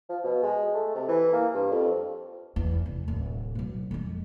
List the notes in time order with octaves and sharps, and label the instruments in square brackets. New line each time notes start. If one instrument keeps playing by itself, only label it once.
[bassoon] F3
B2
G#3
A3
C3
E3
A#3
G2
F2
[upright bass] E2
F1
D1
B2 F#3
F2 G#3